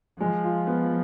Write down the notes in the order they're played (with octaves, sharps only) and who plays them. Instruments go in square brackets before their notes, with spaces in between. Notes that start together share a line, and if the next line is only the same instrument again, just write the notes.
[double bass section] F3 [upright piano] G#3
[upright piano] F4
B3